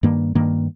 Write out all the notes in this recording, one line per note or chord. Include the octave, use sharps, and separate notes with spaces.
G2 D#3 A#3
G2 D#3 A#3